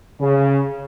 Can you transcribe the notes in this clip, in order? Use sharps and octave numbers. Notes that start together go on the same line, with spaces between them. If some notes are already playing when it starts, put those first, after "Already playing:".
C#3